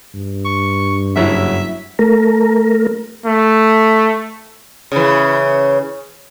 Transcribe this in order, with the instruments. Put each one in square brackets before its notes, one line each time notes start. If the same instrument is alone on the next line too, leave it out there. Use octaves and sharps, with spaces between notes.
[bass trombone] G2
[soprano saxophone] C#6
[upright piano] F#1 F#3 E4 [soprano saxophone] E5
[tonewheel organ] A3 A#4
[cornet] A3
[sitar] C#3 E3